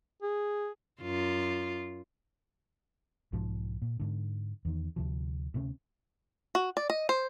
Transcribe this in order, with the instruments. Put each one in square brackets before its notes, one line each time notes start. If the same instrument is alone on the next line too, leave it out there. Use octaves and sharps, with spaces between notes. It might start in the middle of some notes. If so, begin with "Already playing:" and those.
[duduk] G#4
[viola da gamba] F#2 F4
[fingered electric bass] B1 G#2 F3
A#2
G#2 D3
E2 D#3
D2 C3 F3
D2 C3 C4 C#4
[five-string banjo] F#4
D5
D#5
C5